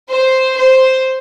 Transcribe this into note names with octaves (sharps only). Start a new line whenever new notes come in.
C5
C5